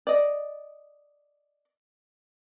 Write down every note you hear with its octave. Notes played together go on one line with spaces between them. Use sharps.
D5 D#5